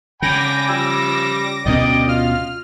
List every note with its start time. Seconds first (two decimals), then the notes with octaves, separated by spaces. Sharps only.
0.22 C#3 G5 G#5 B5 D6 A#6
0.69 F3 G3 E6
1.66 D2 B2 C#4 A#4 D5 D#5 G5
2.08 F4 F6